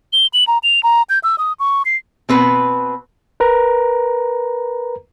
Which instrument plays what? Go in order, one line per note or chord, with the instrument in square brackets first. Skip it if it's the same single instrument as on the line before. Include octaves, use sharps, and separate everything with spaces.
[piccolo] G7
F#7
A#5
F7
A#5
G6
E6
D#6
C#6
C7
[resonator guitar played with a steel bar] B2 C4 B4
[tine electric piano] A#4 B4 A#5